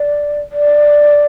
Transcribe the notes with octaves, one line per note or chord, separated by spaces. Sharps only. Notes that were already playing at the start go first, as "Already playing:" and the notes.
Already playing: D5
D5